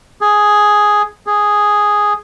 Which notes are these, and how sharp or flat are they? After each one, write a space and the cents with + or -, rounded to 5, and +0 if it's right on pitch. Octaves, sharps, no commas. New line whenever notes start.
G#4 +0
G#4 -5